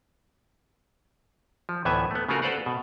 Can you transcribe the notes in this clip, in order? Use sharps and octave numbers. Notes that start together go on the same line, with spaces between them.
F3
D2 A2 E3 B3 E5 G#5
A3 B3
C#3 G#3 A3 F4 F#4 A#4
A4 B4 C5 D5 F5 F#5
B2